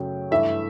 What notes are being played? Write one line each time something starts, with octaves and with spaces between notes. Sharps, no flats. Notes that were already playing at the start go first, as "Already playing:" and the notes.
Already playing: F#2 C#3 F#3 A3 G5
G2 E3 A3 E5